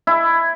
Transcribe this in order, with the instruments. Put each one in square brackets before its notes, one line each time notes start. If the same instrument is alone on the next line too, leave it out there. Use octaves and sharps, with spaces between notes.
[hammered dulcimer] E4